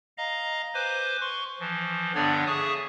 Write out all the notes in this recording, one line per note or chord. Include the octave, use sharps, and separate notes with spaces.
D#5 F5 A#5
B4 C5 G#5 D6
C6 C#6
E3 F3
G2 D3 B3 D4 C#5 D5
G#4 E5 G#5 A5 C#6 D#6